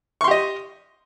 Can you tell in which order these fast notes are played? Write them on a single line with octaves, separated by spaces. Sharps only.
C#6 C6 G4 D#5